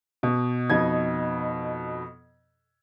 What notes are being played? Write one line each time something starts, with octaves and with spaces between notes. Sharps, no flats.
B2
F2 B2 D#4 G#6